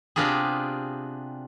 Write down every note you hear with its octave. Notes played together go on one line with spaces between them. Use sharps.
C3 B3 D4 F4 G4 G#4